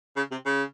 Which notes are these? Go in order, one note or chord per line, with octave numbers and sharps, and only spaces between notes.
C#3
C3
C#3